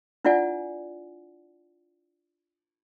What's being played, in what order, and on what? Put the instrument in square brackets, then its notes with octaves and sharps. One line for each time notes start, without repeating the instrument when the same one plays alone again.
[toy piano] D4 E4 F4 D5 F#5 G#5